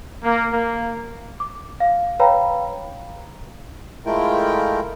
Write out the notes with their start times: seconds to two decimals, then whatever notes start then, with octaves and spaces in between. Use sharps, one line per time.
0.24 A#3
0.53 A#3
1.40 D6
1.80 F5
2.20 B4 C#5 F5 G5 A#5 B5
4.06 G#3 A3 E4 F4 A#4 G5